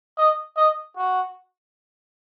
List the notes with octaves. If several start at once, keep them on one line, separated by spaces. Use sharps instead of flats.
D#5
D#5
F#4